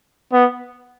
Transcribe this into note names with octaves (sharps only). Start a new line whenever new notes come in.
B3